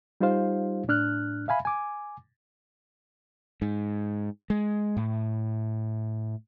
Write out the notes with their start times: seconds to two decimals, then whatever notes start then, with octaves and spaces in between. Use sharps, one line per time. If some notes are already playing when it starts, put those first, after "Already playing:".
0.21 G3 D#4 F4 G4 C5 F5
0.88 A2 D4 F6 F#6
1.48 E5 F5 G#5 B5
1.65 G#5 D6
3.62 G#2
4.50 G#3
4.97 A2